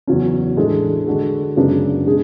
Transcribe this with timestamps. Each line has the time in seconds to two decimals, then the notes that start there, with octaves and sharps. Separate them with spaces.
0.07 E2 C#3 F#3 C#4
0.57 A2 E3 G#3 D4 A4
1.07 D3 G#3 D4 F#4 A4
1.56 F#2 C#3 G#3 B3 D4
2.06 B2 G#3 D4 G#4